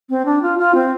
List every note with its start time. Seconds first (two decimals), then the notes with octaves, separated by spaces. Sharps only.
0.10 C4
0.25 D4
0.42 F4
0.58 F4
0.75 C4